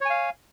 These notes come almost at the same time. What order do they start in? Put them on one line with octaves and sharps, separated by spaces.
C#5 G#5 F5